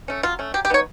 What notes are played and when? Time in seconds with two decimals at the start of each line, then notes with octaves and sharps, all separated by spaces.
0.08 A3 C#4
0.23 F#3 F4
0.39 A3 C#4
0.54 F#3 G4
0.65 G4
0.70 B3 D#4 C#5